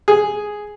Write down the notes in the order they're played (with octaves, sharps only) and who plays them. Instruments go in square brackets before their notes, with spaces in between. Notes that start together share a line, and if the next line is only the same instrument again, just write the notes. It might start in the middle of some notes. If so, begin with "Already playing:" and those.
[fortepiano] G#4